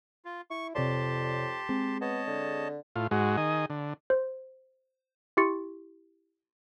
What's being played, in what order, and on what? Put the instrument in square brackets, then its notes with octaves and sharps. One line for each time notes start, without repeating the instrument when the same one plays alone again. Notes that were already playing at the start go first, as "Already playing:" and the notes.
[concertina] F4
[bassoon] E4 [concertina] C#6
[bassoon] F2 [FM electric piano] C3 C#5 D5 [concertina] G4 A5 C6
[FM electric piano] G#3 C4 G#4
[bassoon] B3 [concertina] C#5 D#5 A5
[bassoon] D3
[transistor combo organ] A2 F4
G#2 G#3 F#4
D#3 G#4 D#5
D3
[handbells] C5
E4 G4 C6 C#6 A6 C#7